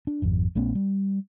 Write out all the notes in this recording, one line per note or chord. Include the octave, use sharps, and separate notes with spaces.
D4
G#1 F2
A#1 A3 B3 C#4
G3